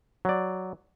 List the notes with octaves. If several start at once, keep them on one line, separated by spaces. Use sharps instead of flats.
F#3 D5